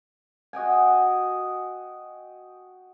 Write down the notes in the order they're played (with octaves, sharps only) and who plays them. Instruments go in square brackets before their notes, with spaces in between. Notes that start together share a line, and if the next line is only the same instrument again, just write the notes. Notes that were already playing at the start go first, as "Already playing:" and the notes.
[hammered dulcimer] F#4 D#5 G5 G#5